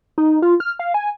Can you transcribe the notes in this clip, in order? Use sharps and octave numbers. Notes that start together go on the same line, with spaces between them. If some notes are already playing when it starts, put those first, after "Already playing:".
D#4
F4
F6
F5
G#5